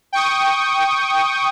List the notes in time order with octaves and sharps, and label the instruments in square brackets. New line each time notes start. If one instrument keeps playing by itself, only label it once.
[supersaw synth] G5 C#6 D#6